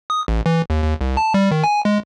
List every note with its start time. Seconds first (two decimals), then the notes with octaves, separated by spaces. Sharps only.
0.10 D#6
0.28 A1
0.46 E3
0.70 D#2
0.83 D#2
1.01 C2
1.17 A5
1.34 G3
1.51 D#3
1.64 G#5
1.85 G#3